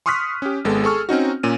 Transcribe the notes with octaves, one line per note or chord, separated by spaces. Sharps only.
C6 C#6 D#6 F6 F#6 B6
C#4 G4
G#1 G#3 B3 A4
G#4 A4 C#6 F6
C4 C#4 D#4 F#4
A#2 C#4 D#7